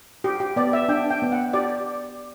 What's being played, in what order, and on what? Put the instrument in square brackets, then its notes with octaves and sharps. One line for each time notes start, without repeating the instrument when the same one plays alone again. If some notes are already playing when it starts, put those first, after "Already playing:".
[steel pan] G4
G4
B3 D5
E5
D4 G5
G5
B3
F#5
G4 D5